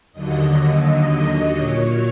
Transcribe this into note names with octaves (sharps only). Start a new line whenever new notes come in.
D#2 D3 F#3 D#5
D#5
A#2 F#3 C#5